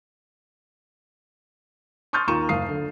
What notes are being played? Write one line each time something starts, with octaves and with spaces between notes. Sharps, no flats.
C6 C#6 D#6 F6 G6 A6
D#2 F4 A#5 C#6 D#7 E7
F#1 F5 D#6 C7
D3